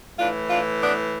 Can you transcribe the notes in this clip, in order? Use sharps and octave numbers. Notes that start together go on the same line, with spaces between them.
A2 E3 D4 F4
D4 F4
B3 D4